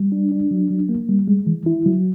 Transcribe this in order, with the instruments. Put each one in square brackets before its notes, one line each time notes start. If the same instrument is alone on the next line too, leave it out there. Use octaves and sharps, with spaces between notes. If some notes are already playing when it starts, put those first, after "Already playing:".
Already playing: [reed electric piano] G3
D4
D4
F#3
F#3
A#3
G3
G#3
E3
E4
F#3